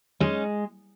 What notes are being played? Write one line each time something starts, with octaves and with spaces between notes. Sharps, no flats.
G#3 C#4 D#4